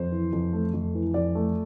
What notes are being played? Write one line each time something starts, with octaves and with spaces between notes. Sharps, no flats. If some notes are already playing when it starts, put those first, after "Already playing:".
Already playing: F2 C5
E3
F2
A3
F2
E3
F2 D5
A3